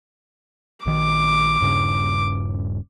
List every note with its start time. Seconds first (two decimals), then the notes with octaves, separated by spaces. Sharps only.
0.86 A#1 D#3 D6
1.61 D#1 G2 C#3